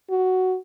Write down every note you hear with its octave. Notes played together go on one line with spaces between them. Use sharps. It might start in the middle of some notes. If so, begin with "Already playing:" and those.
F#4